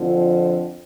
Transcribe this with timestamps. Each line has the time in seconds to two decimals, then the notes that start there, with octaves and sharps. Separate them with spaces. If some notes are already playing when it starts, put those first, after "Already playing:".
Already playing: F2 D3 F3